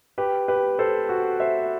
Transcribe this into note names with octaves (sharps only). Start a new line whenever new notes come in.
G4 B4
G4 B4
A4 C5
F#4
C5 E5